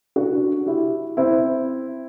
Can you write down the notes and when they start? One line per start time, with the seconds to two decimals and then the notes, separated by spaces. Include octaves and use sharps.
0.16 D4 F#4
0.67 E4 G4
1.17 C4 E4